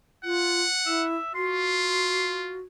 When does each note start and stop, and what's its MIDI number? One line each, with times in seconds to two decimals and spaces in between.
0.24 0.62 65
0.24 1.06 78
0.86 1.15 64
0.86 1.31 76
1.35 2.59 65
1.35 2.61 66
1.35 2.46 84